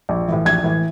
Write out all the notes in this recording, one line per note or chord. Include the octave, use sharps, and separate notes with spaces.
A#1
A2 E3
A#1 G#6
A2 E3